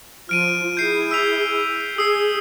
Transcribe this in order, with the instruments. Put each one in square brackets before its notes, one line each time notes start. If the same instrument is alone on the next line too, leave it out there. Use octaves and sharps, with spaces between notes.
[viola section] F3 [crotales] F6 D7 D#7
[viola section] E4 G#4 [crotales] G6 C7
[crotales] E6 B6 F7
[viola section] G#4 [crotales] D#6 E6 C7